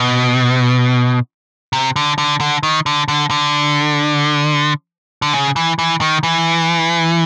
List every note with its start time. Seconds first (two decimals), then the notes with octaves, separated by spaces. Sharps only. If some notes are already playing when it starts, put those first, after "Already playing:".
Already playing: B2
1.73 C3
1.96 D3
2.18 D3
2.40 D3
2.63 D#3
2.86 D3
3.08 D3
3.31 D3
5.22 D3
5.33 C#3
5.56 E3
5.79 E3
6.01 D#3
6.23 E3